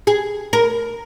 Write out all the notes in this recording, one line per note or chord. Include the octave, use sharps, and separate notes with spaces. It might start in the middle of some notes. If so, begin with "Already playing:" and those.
G#4
A#4